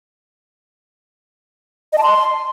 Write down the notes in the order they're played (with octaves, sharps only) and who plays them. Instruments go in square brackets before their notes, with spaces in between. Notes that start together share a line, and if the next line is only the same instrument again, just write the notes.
[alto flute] D#5
A5
C6